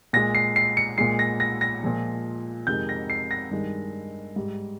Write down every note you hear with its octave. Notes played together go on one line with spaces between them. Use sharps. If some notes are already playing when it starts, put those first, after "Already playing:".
A#2 G#3 A#6
C7
C7
C#7
A#2 G#3 C7
A#6
A#6
A#6
A#2 F3 G#3
F2 C3 D#3 G#3 G6
A#6
C7
A#6
G2 D#3 G#3
G#2 G3